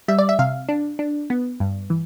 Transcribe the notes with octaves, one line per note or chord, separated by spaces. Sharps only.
G3 E5
D5
E5
C3 F5
D4
D4
B3
G2
E3